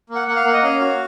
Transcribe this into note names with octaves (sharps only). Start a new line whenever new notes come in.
A#3
F#5
A#3 F#5
F5
A#3 F#5
D#5
C#4 F5
F#4